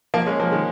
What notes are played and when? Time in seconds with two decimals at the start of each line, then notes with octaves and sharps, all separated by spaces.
0.14 F3 A#3
0.26 G#3 C#4
0.40 F3 A#3
0.52 D#3 G#3